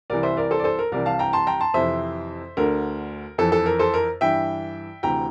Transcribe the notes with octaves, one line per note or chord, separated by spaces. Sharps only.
C2 C3 E3 A#4 D5
C5 E5
A#4 D5
A4 C5
D5
A4 C5
A#4
C2 C3 E3 A#4 D5
F5 A5
G5 A#5
A5 C6
G5 A#5
A5 C6
F2 C3 E3 C5 E5
D2 D3 A#4
F2 E3 A4
A4
A#4
A4 C5
A#4
G2 E3 E5 G5
D2 C3 E3 G5 A#5